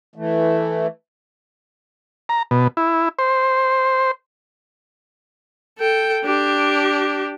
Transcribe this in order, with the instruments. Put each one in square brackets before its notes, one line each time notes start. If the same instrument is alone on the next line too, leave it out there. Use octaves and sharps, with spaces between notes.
[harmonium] E3 A3
[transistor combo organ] A#5
B2
E4
C5
[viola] A4 G5
D4 G4